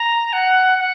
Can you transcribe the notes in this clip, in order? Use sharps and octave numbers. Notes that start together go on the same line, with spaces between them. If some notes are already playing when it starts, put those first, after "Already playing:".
Already playing: A#5
F#5
F#5